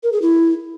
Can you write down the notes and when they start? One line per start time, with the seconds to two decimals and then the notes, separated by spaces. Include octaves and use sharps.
0.03 A#4
0.12 G#4
0.22 E4